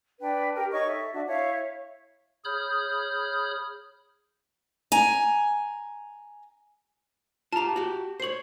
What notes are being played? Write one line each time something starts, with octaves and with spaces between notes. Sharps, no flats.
D4 B4 G5
G4 A#4 G5
D#4 C#5 D#5 C#6
A4 E5
D4 F#4 E5
E4 C#5 E5 F5
G#4 C#5 B5 D#6 F6 G6
G#5 A#5
F4 G4 A5 A#5
F#4 G4
C5 C#5 C7 F#7